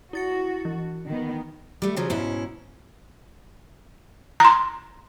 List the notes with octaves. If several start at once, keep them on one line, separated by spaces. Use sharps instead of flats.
E4 F#4 A6 C#7
E3
D#3 B3
G3 A3
C#3 F3 F#3 C#4
G#2 B2 C#4 E4
A#5 C6